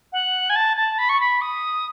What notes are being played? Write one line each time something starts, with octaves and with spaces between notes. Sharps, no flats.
F#5
G#5
A5
A5
B5
C#6
B5
D#6